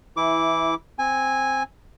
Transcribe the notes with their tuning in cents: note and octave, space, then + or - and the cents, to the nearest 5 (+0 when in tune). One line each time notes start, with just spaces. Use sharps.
E3 +0 E4 -15 D6 -15
C4 +0 G#5 -10